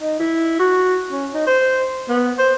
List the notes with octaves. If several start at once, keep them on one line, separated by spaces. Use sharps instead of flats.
D#4
E4
F#4
C#4
D#4
C5
B3
C5